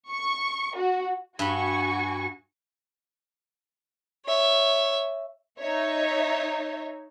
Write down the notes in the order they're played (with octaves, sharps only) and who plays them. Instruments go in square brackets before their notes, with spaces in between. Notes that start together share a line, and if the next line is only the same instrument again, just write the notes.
[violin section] C#6
F#4
[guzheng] G2 B5 [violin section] F#4 G#5 C#6
[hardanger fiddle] C#5 E5
[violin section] D#4 C#5 E5